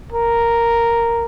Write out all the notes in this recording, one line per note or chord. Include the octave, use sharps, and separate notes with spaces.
A#4